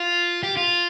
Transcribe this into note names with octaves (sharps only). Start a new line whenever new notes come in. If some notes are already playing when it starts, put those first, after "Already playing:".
Already playing: F4
G4
F4